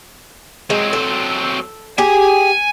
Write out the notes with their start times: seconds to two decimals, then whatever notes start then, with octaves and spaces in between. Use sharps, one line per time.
0.70 F#3 G#3 C4
0.93 A4
1.98 G4 G#4 G#5